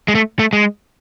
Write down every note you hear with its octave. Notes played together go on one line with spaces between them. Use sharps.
G#3
A3
A3
G#3